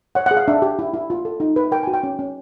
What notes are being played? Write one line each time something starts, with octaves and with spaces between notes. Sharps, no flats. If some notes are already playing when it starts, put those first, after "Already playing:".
C#5 F#5
G#4 F#5
F5
D4 E5
G4
E4
E4
F4
A4
D#4
B4
A#4 G5
F#4 G#5
G5
C#4
C#4